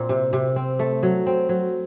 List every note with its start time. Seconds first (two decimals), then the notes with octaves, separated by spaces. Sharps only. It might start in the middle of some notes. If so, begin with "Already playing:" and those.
Already playing: A#2 C4
0.09 C3
0.33 C3
0.56 C4
0.79 A3
1.03 F#3
1.26 C4
1.49 F#3